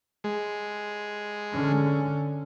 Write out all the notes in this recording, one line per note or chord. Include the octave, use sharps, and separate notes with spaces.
G#3
D3 C#4